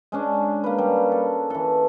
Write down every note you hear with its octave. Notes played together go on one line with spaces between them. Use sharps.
G#3 C#4 D4
A#3 B4
G3
A4
E3 A4